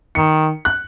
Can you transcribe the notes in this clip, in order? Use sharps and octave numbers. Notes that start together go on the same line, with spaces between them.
D#3 C#7
F#6